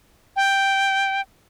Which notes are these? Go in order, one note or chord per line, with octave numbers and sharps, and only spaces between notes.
G5